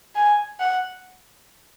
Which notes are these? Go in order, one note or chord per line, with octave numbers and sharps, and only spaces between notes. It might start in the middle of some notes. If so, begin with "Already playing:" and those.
G#5
F#5